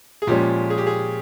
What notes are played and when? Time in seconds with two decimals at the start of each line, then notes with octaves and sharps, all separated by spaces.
0.22 G#4
0.27 A#2 F3 G#3 C#4 G4
0.70 G#4
0.78 G4
0.87 G#4